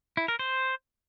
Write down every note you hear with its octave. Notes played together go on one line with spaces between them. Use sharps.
E4
A#4
C5